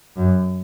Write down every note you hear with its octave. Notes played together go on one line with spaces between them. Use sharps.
F#2